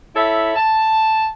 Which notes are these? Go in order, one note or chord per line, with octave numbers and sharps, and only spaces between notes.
E4 A4 C#5 E5 B5
A5